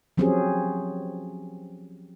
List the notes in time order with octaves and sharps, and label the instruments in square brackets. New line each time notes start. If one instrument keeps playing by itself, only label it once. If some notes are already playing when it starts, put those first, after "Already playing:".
[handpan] F3 F#3 C4 C#4 G4 G#4